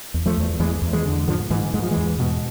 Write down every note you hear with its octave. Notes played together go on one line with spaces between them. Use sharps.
E2
F3 A3
E2
E2 E3 G#3
E2
E3 G#3
D3
G#2 D3 F3
G#2 E3
G#2 G#3
F3
E3 G#3
E2
B2